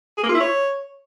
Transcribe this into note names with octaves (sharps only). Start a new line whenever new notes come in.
G#4
A#3
F4
E4
C#5